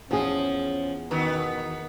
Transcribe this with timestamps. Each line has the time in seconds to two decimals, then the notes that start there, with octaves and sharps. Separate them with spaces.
0.11 E2 F3 C#4 G#4
1.11 B2 D#3 B3